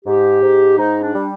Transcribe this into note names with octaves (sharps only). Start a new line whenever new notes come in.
G#2 G4
G#2
G#2 D#4
D4
G3